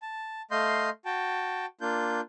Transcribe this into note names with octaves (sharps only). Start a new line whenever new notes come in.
A5
A3 D#5 F5 C6 G6
F#4 G5 A5
A#3 D4 F4 G6